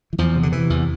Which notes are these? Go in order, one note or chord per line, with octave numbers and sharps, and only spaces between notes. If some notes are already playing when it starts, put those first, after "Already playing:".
E3
E2 F3
C3
D3
C3 E3
E2